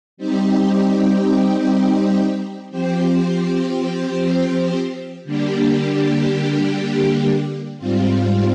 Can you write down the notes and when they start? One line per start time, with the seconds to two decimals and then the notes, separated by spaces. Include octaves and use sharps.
0.17 G3 C4 D#4 G4
2.71 F3 C4 G4 C5
5.24 D3 G3 A#3 D4 G4
7.78 G#2 G3 C4 F4